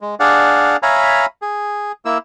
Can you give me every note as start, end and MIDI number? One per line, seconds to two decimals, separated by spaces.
0.01 0.15 56
0.20 0.76 62
0.20 0.76 68
0.20 0.76 74
0.20 0.76 77
0.20 0.76 78
0.83 1.26 73
0.83 1.26 76
0.83 1.26 77
0.83 1.26 80
0.83 1.26 82
0.83 1.26 83
1.42 1.92 68
2.05 2.18 58
2.05 2.18 64
2.05 2.18 88